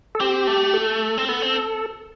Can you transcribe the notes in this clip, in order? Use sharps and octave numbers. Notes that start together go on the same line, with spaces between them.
A4
C4 G4
A3
A4
C4
B3 A4
C4